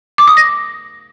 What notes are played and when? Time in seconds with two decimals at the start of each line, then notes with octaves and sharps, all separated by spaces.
0.18 D6
0.28 D#6
0.37 A#6